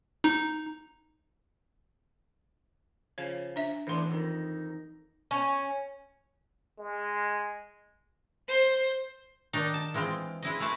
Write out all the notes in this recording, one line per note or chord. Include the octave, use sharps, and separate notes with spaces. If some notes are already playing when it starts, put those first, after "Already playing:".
D#4
C#3 F3 C#5
D4 E5
A2 E3 B3 D4 C6
F2 D#3 D#4
C#4
G#3
C5
D#3 D4 D#4
A5
E3 G#3 C4 F4
G#3 E4 D#5
G#3 A3 G#4 B4 D#5 A5